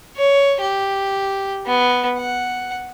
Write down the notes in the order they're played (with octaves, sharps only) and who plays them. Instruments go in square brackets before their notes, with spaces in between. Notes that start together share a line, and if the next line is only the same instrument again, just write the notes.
[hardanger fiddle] C#5
G4
B3
F#5